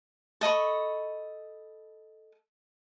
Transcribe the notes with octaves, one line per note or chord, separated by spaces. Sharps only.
A4 D#5 B5 C#6